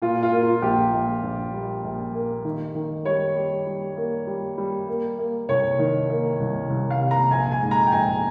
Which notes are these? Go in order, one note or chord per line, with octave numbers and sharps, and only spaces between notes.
A#2 F4
F4
A#3
F4
A#1 G4
A#1
A#1
G3
A#1
A#3
D#3
D#3
G3 C#5
G3
G3
A#3
G3
G3
A#3
A#3
C2 C#5
D#3
A#3
C2
C2
F5
C3
A#5
A#1 G#5
G#5
G#2
A#5
G5
A#1 G#5